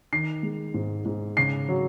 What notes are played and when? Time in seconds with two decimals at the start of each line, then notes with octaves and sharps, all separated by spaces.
0.13 D#3 C7
0.43 G#3
0.74 G#2
1.05 G#2
1.37 C#3 C7
1.69 F#3